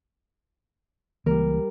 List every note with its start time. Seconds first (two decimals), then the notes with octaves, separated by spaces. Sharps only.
1.26 C#2 E3 G3 A#3 A#4